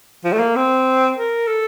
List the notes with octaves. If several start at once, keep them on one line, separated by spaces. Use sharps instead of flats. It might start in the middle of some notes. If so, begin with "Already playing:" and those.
F3
A3
A#3
C4
A#4
A4